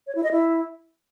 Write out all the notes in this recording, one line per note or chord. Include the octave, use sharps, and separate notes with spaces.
C#5
E4
D#5
E4